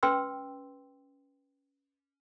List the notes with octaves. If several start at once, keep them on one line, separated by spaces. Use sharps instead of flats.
C#4 B4 G5 C6 E6